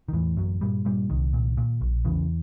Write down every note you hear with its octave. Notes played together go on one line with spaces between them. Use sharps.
D#3
E2 A2 E3
A1 F#2 F#3
G2 A#2 G3
G2 A#2 G3
C2 D#3
A#2
A#2
A#1
E2 C#3 E3